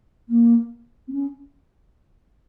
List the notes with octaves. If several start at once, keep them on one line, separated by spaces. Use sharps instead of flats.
A#3
C4
C#4